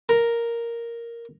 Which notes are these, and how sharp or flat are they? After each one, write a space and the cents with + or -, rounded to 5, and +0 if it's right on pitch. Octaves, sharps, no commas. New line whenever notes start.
A#4 +0